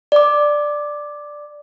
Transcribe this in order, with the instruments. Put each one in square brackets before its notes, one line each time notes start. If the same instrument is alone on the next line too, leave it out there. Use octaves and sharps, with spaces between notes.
[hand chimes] D5 D6